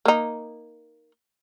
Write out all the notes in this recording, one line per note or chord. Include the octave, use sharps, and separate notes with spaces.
A#3 D#4